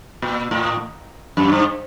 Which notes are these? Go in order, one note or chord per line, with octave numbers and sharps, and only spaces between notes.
A#2
A2
F#2
G2